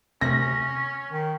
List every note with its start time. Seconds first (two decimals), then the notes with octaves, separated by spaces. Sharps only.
0.21 D2 C3 C#4 F#6 A#6
1.11 D#3